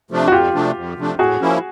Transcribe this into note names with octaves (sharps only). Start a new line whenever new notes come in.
C3 F3 A3 D4
F#4
F2 F4 G4
C3 F3 A3 D4
F2
C3 F3 A3 D4
A2 F#4 G#4
F3 A#3 C#4 E4